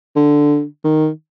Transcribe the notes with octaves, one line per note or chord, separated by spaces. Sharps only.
D3
D#3